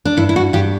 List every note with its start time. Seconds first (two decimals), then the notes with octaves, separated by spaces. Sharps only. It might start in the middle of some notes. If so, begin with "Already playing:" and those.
0.05 D4
0.17 G2 E4
0.29 E4
0.36 F#4
0.53 G2 G4